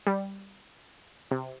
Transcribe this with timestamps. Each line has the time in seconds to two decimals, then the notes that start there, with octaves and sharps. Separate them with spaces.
0.07 G3
1.31 C3